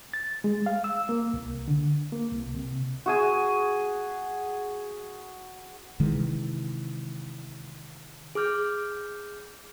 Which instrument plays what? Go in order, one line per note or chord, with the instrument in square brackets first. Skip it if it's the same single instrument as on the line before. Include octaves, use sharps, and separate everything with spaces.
[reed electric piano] A6
G#3
F5
E6
A#3
C2
D3
A#3
C2
C3
[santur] F#4 G#4 G#5
[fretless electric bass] C3 D#3 E3 G#3
[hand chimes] G#4 D6 F6 G6